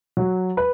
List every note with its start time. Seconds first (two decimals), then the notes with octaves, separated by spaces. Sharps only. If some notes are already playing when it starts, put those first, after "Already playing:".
0.17 F#3
0.57 B4